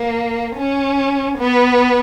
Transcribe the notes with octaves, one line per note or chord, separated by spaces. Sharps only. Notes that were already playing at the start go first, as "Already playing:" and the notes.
Already playing: A#3
C#4
B3